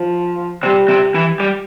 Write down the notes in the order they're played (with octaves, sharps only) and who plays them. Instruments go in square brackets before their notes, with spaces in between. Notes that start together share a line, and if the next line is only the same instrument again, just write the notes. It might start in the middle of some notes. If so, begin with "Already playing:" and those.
Already playing: [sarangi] F3
[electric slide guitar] C3 C4 [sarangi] G3
[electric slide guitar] C3 C4
E3 E4
G3 G4